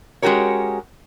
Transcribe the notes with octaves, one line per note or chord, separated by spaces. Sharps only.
G#3 C#4 F#4 G4 A#4 C#5